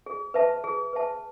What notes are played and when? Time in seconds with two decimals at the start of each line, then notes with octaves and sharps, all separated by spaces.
0.06 G#4
0.34 B4 E5 A5
0.64 G#4
0.93 B4 E5 A5